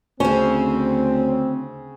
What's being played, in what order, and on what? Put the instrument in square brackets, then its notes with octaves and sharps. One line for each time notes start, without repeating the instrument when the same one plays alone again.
[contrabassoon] D2 [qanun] C#3 C5 [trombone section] C4 [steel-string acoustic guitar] C#4